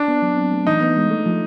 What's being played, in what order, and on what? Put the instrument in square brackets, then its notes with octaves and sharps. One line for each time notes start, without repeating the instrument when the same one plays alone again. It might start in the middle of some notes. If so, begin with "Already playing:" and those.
Already playing: [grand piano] D4
[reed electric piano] B3
F#3
C4
A3
[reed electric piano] E3 [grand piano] D#4
[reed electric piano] B3
G#3
A3
F3